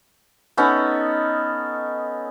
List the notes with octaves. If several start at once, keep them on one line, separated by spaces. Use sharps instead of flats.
B3 C#4 D#4 A4